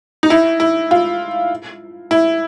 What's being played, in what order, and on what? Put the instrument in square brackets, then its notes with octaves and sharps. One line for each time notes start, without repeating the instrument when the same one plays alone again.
[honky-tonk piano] D#4
E4
E4
F4
E4